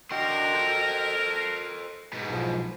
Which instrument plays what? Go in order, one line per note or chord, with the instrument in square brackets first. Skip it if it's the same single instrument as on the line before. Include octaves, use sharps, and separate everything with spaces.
[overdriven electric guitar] D3 C6 [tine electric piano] F#4 D#5 G5 [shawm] A#4
[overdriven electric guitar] A4 C5
[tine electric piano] C7
[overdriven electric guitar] G#2 B2
[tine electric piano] B1 F3